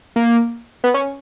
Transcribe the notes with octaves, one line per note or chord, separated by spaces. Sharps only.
A#3
B3
C#4